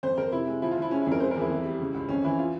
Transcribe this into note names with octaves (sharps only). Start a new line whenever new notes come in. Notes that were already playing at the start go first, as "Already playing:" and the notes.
F2 C5
F2 A#4
C3 E4
G#3
F3 E4
F4
F3 E4
G#3 C#4
E4
F2 A#4
G#3 C5
A#4
E2
E4
F2
G3
C#3
C#2
F2 C#4
E3 E4
F4